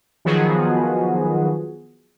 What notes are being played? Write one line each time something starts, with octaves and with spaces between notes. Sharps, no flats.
D#3 F3 F#3 B3 F#4 G#4